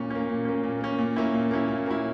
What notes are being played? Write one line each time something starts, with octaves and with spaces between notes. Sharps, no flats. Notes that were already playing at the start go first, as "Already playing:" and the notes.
Already playing: A#2 A#3 C#4
A#3 C#4
A#2
A#3 C#4
A#2
A#3 C#4
A#2
A#3 C#4 E4
A#2
A#3 C#4 E4
A#2
A#3 C#4 E4